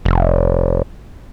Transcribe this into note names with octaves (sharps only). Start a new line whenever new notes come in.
F1